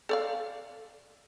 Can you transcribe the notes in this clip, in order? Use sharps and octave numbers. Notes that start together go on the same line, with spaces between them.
A4 D5 F5